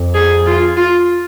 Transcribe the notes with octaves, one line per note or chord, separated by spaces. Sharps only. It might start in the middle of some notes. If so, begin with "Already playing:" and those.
Already playing: F2
G#4
F4
F4